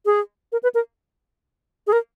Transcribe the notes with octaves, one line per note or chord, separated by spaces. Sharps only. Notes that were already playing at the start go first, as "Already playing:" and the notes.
G#4
A#4
B4
A#4
G#4
A#4